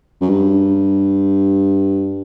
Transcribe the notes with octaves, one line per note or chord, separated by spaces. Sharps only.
F#2
G2